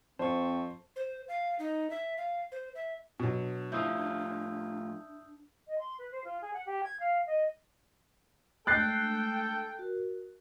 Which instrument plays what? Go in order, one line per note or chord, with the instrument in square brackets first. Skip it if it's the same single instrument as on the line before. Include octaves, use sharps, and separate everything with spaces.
[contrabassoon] F2 [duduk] C4 [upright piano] C5 [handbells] A5 C#6
[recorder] C5
F5
D#4
E5
F5
C5
E5
[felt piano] B2 F#3 [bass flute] D4
[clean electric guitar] A2 F3 F4 [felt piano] E4 [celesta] D#6 E6 G6
[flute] D#5
C6
B4
C5
F4
G#4
F#5
G4
G#6
F5
D#5
[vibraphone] G#3 A3 D4 [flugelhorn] A4 [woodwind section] G5 [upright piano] F#6 A6 C7
[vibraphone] F#4 A#4